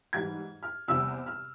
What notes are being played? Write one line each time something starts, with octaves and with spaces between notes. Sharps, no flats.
G#2 E3 G3 G#6
F6
E2 C3 G3 C4 E6
F6